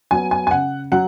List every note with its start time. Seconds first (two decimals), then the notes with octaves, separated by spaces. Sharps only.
0.11 F#3 B3 G#5
0.31 G#5
0.47 G#5
0.51 C#3 F#5
0.92 F#3 F#5